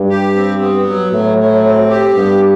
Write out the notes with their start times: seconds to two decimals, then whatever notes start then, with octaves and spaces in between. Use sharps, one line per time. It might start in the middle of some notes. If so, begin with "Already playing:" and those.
Already playing: G2
0.09 G4
0.36 C4
0.61 B3
0.87 F#3
1.12 A2 F#3
1.38 F#3
1.64 C4
1.89 G4
2.15 G2 B3